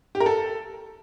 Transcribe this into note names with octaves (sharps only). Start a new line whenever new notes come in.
G4
A#4
A4